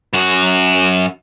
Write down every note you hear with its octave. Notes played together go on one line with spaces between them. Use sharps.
F#2 F#4